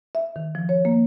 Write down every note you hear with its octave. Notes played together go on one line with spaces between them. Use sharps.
E5
D#3
F3
C#5
A#3